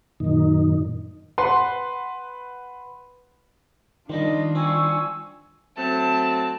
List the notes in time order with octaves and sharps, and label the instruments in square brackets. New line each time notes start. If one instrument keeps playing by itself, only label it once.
[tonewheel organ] F#2 A#2 D#3 D#4
[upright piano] B4 F#5 C6
[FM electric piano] D#3 [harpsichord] F3 G3 G4 [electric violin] D4 F4 [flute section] D#5
[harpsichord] G3 C4 [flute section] G#5 C#6 E6
[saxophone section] F#3 A3 C4 [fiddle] A5